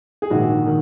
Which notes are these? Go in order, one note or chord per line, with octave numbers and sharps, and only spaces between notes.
G#4
A#1 G#2 D#3 F#4
D#3